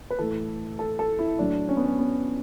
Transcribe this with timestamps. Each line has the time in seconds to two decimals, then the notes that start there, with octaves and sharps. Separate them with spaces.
0.10 B4
0.19 A2 E3 A4
0.79 A4
0.99 A4
1.19 E4
1.39 A2 F#3 D4
1.69 C#4
1.77 B3
1.85 C#4
1.99 B3